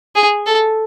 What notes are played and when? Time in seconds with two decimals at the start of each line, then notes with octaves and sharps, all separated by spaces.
0.15 G#4
0.46 A4